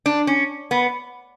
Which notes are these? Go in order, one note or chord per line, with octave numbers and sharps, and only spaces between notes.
D4
C#4
B3